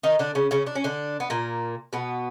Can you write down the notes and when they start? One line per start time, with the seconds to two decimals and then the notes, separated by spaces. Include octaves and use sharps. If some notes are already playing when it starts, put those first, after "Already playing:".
0.03 D#3 D#4
0.19 D3 D4
0.35 C#3 C#4
0.51 C#3 C#4
0.66 D4
0.75 C#4
0.84 D3 D4
1.20 B3
1.30 A#2 A#3
1.93 B2 B3